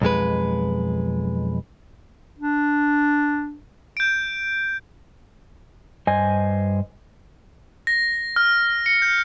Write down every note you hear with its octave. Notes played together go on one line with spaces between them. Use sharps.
B1 F2 G#3 B4
D4
G6 D7
G2 C5 D#5 G#5
A#6
F6
C#7
G6